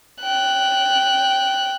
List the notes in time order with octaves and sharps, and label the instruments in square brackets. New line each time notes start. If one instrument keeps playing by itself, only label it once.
[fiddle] G5 F#6